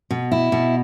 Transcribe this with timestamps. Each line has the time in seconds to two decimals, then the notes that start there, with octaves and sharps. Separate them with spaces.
0.11 B2
0.32 E4
0.52 B2